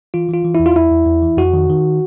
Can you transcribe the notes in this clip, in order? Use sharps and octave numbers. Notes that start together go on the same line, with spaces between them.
E3 F4
E3 F4
E3
E2 E4
F4
E2 E4
E2
E2
E3
F2 F#4
D#3
D#3